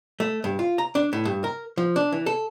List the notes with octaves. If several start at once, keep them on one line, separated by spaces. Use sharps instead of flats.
A3
G2
F4
A#5
D4
A2
G2
A#4
F3
D4
E3
A4